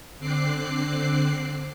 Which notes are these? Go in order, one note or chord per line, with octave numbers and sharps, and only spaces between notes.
D3 C4 D6 F#6 C7